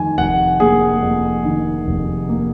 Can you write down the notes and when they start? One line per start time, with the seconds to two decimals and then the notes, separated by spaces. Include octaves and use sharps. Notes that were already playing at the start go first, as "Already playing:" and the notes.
Already playing: F2 D#3 G#5
0.18 F1 F#5
0.60 A#3 G#4
1.02 F2
1.45 D#3
1.87 F1
2.29 A#3